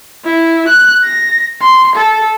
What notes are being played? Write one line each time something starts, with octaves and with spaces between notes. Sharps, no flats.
E4
F#6
A#6
C6
A4